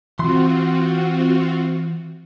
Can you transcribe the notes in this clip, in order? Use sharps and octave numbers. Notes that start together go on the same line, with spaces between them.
E3 C4 F4 F#4 C6